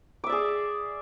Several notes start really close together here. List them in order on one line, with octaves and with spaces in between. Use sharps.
D6 E5 D5 G#4